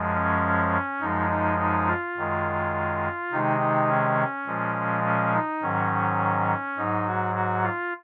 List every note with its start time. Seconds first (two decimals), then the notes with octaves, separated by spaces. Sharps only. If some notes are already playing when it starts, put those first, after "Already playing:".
Already playing: F#2 F3 G#3
0.15 C#4
1.00 F#2 F3 G#3 D#4
1.30 D#4
1.59 D#4
1.87 F4
2.16 F#2 D#3 G#3
3.32 C3 D#3 G#3 D#4
3.60 D#4
3.89 C#4
4.47 A#2 F3 G#3
5.04 C#4
5.33 D#4
5.62 G#2 D#3 F#3 C#4
6.77 G#2 F#3 D#4
7.06 F#4
7.35 F#4
7.63 F4